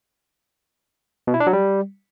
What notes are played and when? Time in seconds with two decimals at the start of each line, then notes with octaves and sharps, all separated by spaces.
1.27 B2
1.34 E4
1.40 D4
1.47 F#3
1.53 G3